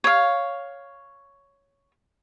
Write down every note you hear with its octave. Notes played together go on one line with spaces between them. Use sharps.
C#5 F5